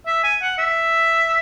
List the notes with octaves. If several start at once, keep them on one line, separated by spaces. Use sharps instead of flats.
E5
G#5
F#5
E5